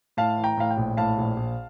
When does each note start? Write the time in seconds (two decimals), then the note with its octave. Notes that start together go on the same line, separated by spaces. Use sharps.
0.17 A2 F5 A5
0.37 E3
0.44 G5 A#5
0.57 A2 F5
0.71 G5
0.77 A#1
0.97 A2 F5 A5
1.18 A#1
1.37 A#1